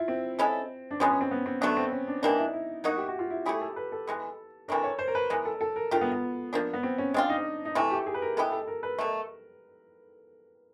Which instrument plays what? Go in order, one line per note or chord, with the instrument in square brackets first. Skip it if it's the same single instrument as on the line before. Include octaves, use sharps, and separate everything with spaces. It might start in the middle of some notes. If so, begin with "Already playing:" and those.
Already playing: [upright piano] E4 F4
C4
[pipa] G#3 C#4 E4 A4
[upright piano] D4
[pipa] F3 G#3 B3 [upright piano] C#4
[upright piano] C#4
C4
B3
C4
[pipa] D3 F#3 A3 D4 [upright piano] B3
[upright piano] C4
C#4
D4
[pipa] E3 G3 A#3 D4 [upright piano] D#4
[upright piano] E4
E4
[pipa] F#3 A#3 D#4 F#4
[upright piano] G4
F#4
F4
E4
[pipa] A3 C#4 E4 G#4 [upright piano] G4
[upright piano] A4
B4
A4
[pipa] E3 G#3 B3
[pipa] C3 E3 A3 D4 [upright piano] A#4
[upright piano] C#5
C5
A#4
B4
[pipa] E3 G#3 B3 [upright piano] A#4
[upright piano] A4
A4
A#4
[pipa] A3 D4 G4 A#4 [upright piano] F4
[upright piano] B3
B3
[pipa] F3 A#3 D4
[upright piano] B3
C4
C#4
[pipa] G#3 C4 F4 [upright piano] D4
[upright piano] D#4
D#4
[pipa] C3 E3 A3 [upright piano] E4
[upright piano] G4
G#4
B4
A#4
[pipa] G#3 B3 E4 G4 [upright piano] A4
[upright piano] A4
A#4
B4
[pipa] B2 F#3 A3 [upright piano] A#4